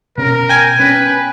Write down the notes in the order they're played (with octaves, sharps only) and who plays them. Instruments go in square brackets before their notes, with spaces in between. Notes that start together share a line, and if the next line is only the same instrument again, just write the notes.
[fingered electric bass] B2 C#4 [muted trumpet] A#4
[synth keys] G5 G#5
[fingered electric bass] B3 C#4 [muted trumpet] B4